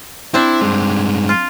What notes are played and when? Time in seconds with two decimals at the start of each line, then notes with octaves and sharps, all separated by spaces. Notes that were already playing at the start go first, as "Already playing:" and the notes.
0.34 C4 D4 E4
0.62 G2 G#3
1.29 F4